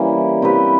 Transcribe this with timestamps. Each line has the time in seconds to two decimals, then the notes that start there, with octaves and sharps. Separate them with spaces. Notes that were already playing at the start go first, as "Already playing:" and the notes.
Already playing: E3 G3 A#3 C#4
0.42 C4 E4 G4 B4